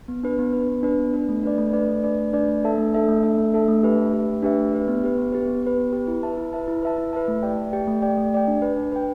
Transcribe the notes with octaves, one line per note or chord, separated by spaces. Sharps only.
B3
D4 B4
B3
D4 B4
B3
D4 B4
B3
D4 B4
A3
D4 B4 D5
A3
D4 B4 D5
A3
D4 B4 D5
A3
D4 B4 D5
A3
D4 A4 E5 A5
A3
D4 A4 E5 A5
A3
D4 A4 E5 A5
A3
D4 A4 E5 A5
A3
D4 G4 B4 E5
A3
D4 G4 B4 E5
A3
D4 G4 B4 E5
A3
D4 G4 B4 E5
B3
G4 B4
B3
G4 B4
B3
G4 B4
B3
G4 B4
E4
B4 E5 A5
E4
B4 E5 A5
E4
B4 E5 A5
E4
B4 E5 A5
A3
G4 D5 G5
A3
G4 D5 G5
A3
G4 D5 G5
A3
G4 D5 G5
D4
B4 G5
D4
B4 G5